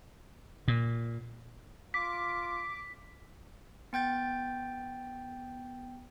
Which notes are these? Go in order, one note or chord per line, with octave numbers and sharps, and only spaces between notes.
A#2
F4 D6 B6
B3 G5 G6 A6